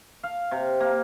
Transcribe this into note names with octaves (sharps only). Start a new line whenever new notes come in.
F5
C3
A#3